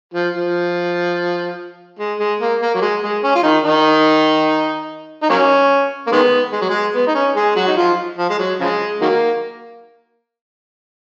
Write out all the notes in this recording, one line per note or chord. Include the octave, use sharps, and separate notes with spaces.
F3
F3
G#3
G#3
A#3
A#3
F#3
G#3
G#3
C#4
F4
D#3 D#4
D#3 D#4
D#4
F#3 A#3 C#4
A#3
D#3 G#3 B3
G#3
F#3
G#3
B3
D#4
C#4
G#3 G#4
F#3 F#4
D#4
F3 F4
F3
G#3
F#3
C#3 F3 G#3
D#3 F#3 A#3